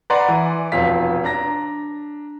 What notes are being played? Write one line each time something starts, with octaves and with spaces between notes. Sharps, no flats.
B4 D5 F#5 G#5 A#5 C6
E3
F1 B1 F3 F5 B6
D4 A#5 A#6